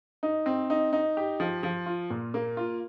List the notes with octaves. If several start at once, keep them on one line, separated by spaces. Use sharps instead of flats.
D#4
C4
D#4
D#4
G4
F3
F3
F4
A#2
A#3
F4